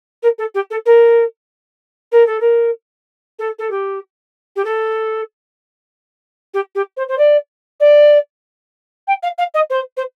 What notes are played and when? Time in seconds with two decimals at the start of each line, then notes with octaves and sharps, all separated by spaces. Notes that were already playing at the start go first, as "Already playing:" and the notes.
0.23 A#4
0.38 A4
0.55 G4
0.71 A4
0.86 A#4
2.12 A#4
2.27 A4
2.40 A#4
3.39 A4
3.59 A4
3.71 G4
4.56 G4
4.65 A4
6.54 G4
6.75 G4
6.97 C5
7.09 C5
7.18 D5
7.80 D5
9.08 G5
9.23 F5
9.38 F5
9.54 D#5
9.70 C5
9.97 C5